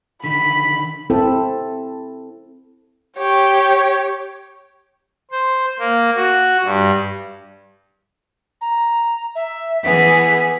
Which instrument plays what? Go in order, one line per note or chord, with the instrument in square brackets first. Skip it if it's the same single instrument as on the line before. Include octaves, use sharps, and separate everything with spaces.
[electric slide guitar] D3 D#3 [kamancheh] B5 [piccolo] B6
[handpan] C4 E4 A4
[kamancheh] G4 C#5
[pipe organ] C5
A#3
F#4
G2
[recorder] A#5
E5
[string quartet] E3 B3 G#4 [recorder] B6